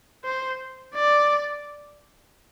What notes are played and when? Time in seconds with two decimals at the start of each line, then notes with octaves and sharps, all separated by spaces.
0.24 C5
0.94 D5